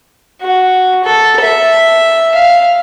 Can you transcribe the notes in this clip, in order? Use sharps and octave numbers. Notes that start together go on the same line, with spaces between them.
F#4
A4
E5
F5